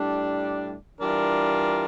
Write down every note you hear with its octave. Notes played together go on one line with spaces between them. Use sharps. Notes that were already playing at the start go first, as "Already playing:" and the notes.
Already playing: A2 G3 D4
E3 G3 D4 F4 A#4